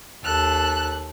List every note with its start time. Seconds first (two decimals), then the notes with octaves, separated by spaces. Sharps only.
0.24 D#2 A4 F#6